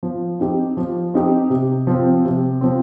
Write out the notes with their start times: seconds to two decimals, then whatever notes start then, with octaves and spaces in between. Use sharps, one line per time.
0.03 F3
0.39 C4 D#4 G4
0.77 F3
1.14 C4 D#4 G4
1.50 C3
1.87 F3 C4
2.25 C3
2.61 F3 C4